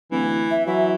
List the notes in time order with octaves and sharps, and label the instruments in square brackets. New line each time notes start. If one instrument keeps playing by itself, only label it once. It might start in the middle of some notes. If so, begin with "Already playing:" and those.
[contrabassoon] D1 [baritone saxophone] E3
[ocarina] E5
[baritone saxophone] E3 [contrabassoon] F#3 [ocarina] E5